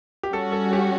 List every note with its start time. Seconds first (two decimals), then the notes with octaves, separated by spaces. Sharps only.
0.23 G4
0.33 G3 C#4 F#4 A4
0.52 A4
0.73 G4